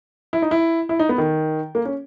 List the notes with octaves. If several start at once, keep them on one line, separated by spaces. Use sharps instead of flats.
E4
D#4
E4
E4
D#4
B3
D#3
A#3
C#4